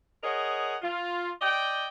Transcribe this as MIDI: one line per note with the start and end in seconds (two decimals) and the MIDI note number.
0.24 0.76 68
0.24 0.76 70
0.24 0.76 73
0.24 0.76 75
0.24 0.76 78
0.82 1.29 65
1.42 1.87 74
1.42 1.87 75
1.42 1.87 79